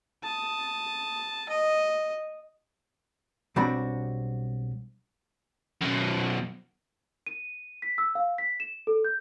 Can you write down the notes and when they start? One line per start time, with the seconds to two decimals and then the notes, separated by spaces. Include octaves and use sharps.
0.23 A5 D#6
1.49 D#5
3.56 B1 G3 C4 D4 F#4 B5
5.82 F#2 B2
7.27 D#7
7.82 B6
7.98 E6
8.15 F5
8.38 B6
8.60 E7
8.87 A4
9.05 G6